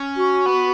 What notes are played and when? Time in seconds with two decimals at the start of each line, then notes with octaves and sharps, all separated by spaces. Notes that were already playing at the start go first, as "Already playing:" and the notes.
Already playing: C#4
0.17 F#4
0.46 B3